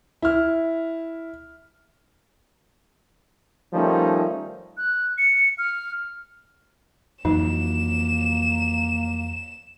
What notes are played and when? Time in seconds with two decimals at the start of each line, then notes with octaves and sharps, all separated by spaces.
0.22 E4 F6
3.74 D#3 F3 G3 A3 C#4 D#4
4.77 F#6
5.18 C#7
5.58 F6
7.25 F2 E3 F#3 A#3 D#4 E7